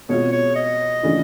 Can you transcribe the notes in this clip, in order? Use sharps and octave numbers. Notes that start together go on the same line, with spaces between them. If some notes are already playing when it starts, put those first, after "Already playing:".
B2 G#3 C4 F4 C#5
C#5
D#5
C#3 E3 A3 D4 F4